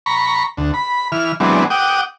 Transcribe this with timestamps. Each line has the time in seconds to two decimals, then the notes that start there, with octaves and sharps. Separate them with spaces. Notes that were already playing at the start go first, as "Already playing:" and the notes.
0.06 A#5 B5 C#6
0.57 D2
0.74 B5
1.12 E3 F6
1.40 E3 F#3 G#3 B3 C4 D4
1.70 F#5 G5 D6 D#6